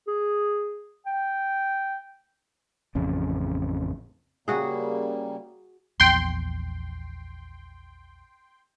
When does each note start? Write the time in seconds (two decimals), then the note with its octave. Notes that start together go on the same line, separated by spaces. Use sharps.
0.07 G#4
1.06 G5
2.95 A1 F2 C#3
4.48 C#3 G3 A#3 F#4 G#4
6.00 A#1 E2 F3 G5 C6